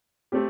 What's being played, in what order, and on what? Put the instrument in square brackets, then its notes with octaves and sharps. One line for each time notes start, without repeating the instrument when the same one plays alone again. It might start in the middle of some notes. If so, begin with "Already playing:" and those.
[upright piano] A3 C4 G4